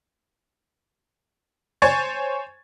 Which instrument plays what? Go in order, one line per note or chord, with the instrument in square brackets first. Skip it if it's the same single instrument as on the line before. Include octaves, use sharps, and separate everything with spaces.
[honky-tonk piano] C5 C#5 G#5 C#6 G#6 A6